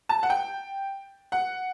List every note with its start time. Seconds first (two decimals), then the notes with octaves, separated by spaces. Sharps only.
0.09 A5
0.23 F#5
0.30 G5
1.32 F#5